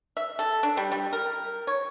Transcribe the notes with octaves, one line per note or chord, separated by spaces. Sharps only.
E5
A4
D4
G3
G3
A#4
C#5